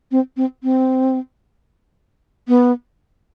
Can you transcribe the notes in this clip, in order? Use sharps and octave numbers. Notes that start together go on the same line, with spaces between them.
C4
C4
C4
B3